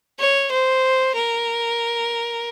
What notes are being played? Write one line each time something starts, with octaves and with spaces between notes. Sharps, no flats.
C#5
C5
A#4